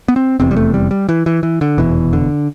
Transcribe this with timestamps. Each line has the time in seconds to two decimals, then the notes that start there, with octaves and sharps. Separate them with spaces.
0.08 B3
0.16 C4
0.39 F1 E2 C3 C4
0.51 G3
0.56 A3
0.74 G3
0.91 G3
1.09 E3
1.26 E3
1.43 E3
1.61 D3
1.78 F1 E2 B2 E3
2.13 D3